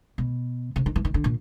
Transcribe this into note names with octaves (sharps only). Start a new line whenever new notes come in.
B2
C3
D#3
E3
D#3
D3
A#2